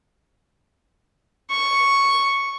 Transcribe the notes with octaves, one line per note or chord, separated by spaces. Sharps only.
C#6